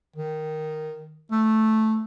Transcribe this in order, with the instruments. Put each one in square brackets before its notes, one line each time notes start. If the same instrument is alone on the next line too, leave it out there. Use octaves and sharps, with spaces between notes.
[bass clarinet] D#3
A3